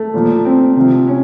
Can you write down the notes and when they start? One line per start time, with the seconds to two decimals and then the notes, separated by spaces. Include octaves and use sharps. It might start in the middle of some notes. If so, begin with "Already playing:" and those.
Already playing: A3
0.14 A#2 F3
0.45 C4
0.76 C3 F3
1.08 C#4